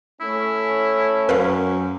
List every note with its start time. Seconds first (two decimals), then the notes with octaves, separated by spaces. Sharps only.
0.21 A3 C#4 E4
1.29 F#2 A#4 B4 F5